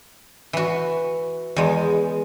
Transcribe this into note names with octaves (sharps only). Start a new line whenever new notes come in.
E3 F#4
E2 G#3